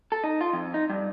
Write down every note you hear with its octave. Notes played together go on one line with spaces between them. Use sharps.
A4
D#4
F4
F2
D#4
G2